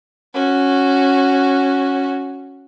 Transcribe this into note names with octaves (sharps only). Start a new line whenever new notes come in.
C#4 F#4